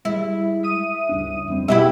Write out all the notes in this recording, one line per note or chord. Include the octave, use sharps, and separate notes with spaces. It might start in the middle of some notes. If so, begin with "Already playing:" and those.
G3 G#3 E4
E5 D#6 D#7
C#2 G2 D4
F2 G3 C4
B2 G#3 E4 G4 E5